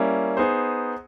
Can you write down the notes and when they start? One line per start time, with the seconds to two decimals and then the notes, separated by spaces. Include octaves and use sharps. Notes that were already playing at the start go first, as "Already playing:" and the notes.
Already playing: G3 A#3 C#4 E4
0.37 B3 D#4 G#4 C5